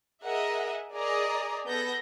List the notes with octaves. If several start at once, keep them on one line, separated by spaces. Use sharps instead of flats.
G#4 A#4 D#5 E5 F#5
G#4 A#4 D5 D#5 A#5
B3 A4 G6 A#6